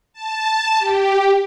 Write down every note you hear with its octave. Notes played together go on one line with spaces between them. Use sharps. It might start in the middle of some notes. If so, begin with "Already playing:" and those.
A5
G4